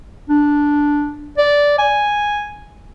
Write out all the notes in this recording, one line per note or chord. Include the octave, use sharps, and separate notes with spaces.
D4
D5
G#5